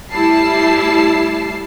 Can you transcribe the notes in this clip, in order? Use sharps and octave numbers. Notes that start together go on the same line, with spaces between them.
A2 G3 E4 A5 C7